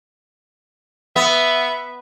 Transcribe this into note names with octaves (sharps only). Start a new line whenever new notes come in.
B3 E5